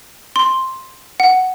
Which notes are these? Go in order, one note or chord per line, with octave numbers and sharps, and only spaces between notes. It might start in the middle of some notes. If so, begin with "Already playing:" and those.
C6
F#5